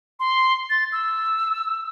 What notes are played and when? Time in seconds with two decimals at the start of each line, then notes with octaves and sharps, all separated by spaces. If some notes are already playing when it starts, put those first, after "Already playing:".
0.20 C6
0.70 A6
0.92 E6